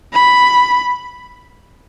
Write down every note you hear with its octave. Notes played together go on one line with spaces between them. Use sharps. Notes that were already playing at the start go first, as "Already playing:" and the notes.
B5